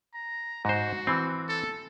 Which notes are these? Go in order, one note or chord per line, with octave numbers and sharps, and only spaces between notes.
A#5
G#2 F#4 C5
E3 C4
A4